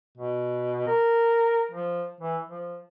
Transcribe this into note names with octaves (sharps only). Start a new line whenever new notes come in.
B2
A#4
F3
E3
F3